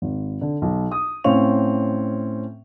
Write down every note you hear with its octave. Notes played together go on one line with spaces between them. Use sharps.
G#1
D3
B1
D#6
A2 C4 C#4 F5 C#6 F7